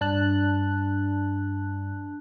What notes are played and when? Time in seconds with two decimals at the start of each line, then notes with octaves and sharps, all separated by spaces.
0.01 G2 D4 A5 F#6